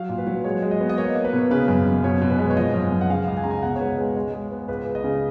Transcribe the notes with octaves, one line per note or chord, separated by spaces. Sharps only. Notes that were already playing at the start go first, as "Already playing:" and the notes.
Already playing: F#3 F5
A#2
B4
F#3
G#3 C#5
G#3
D#5
B3
D#5
A#3 C#5
A#3
B4
B2
C#3 B4
F#2
F#2
B2 C#5
B2
B4
G#3
C#5
F3 D#5
F#2
F#2
F#5
C#3 F5
C#2
G#5
C#3 A#5
G#5
B2 F#5
C#5
G#3 B4
G#3
G#3
G#3
B3
C#2 B4
C#2
D#5
C#3